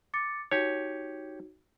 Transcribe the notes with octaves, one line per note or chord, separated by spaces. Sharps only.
D6 A6 C#7
D#4 F#4 G4 C#5